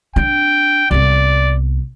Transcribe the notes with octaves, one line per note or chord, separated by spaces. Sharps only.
C4 D4 G5
C2 B3 D5